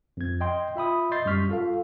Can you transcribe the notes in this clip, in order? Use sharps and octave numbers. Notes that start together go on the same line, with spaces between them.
F2 G#6
D#5 G5 C6
F4 E5 B5 D#6
D#5 C6 G6 A6 C7
F#2 G3 C#6 F6 B6
F4 A4 F5